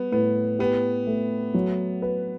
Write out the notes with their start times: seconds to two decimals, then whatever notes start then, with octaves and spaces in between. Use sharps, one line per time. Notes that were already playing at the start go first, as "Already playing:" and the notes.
Already playing: G3 B3
0.12 A2 B3
0.59 B3 G4
1.07 A3
1.54 F#3
2.02 B4